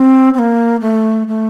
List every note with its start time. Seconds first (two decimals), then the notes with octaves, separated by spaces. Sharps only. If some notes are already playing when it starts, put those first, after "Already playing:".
Already playing: C4
0.34 C4
0.39 A#3
0.81 A3
1.28 A3